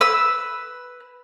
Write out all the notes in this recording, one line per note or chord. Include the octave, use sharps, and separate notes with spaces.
B4 E6